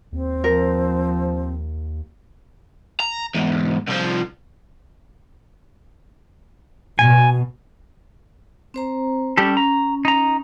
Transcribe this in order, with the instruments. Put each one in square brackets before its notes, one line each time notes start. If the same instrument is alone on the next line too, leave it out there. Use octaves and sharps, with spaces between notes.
[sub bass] D#2 [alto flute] C4
[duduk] F3 [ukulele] A#4
[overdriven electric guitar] A#5
E2 G#2
C2 F3
[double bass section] B2 [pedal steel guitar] G#5
[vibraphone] C4 C5 A#5
[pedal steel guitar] G3 G4 A4 [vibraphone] C#4
[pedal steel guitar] A#5
D#4 A#5